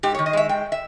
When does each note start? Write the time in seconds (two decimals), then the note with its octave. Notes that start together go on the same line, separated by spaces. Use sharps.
0.03 G#2 G4
0.15 C#5
0.19 D#3
0.26 D#5
0.33 G#3 E5
0.49 G#2 G5
0.72 E5